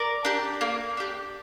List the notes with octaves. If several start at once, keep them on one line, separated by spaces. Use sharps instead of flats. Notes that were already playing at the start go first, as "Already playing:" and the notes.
Already playing: A#4 D5
D4 G4
A#3
D4 G4